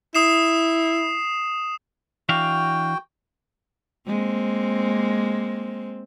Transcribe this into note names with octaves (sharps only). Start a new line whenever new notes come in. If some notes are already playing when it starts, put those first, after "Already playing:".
E4 D#6 C7 E7
E3 D4 F#4 F5 G5
G#3 A#3 C4